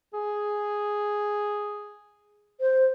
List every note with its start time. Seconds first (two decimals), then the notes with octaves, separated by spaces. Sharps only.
0.14 G#4
2.61 C5